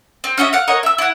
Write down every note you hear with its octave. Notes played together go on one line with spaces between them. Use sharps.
C4
C#4 F#4 D#5 E5
F5 F#5
A#4 C#5 D#5 F#5
E5 E6
E4 F#5